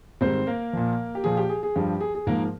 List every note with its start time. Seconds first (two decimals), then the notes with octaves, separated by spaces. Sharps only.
0.21 G#2 D#3 G3 C4 C5
0.47 A#3 A#4
0.73 A#2 F3
1.15 G4
1.24 A#2 F3 G#4
1.37 G4
1.49 G#4
1.63 G#4
1.76 G2 F3 G4
2.01 G#4
2.15 G#4
2.27 G#2 F3 A#3 A#4